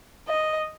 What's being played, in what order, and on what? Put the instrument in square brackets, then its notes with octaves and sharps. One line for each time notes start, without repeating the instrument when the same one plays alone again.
[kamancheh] D#5